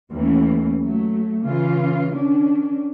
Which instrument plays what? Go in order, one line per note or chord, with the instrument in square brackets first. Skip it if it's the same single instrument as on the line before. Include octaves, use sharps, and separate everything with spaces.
[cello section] D#2 E3 A3 C#4
F#3 A3
C#3 E3 C#4 F4
D#3 C#4 D4